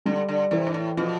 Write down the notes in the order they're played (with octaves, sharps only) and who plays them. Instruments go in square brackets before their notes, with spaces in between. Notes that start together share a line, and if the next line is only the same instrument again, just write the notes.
[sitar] D3 [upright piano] G3
[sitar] D3
[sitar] C3 [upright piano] E3
[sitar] G2
A2
[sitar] B2 [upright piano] F3